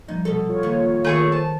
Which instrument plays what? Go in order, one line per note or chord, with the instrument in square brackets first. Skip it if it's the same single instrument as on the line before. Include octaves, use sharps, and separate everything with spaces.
[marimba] A#2 F3 G3 [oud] D#4
[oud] B2 A4
[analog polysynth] F4 C#5
[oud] D#2
[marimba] D#3 A#4 [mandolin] A3 G#4 C#6
[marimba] C5 [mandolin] A5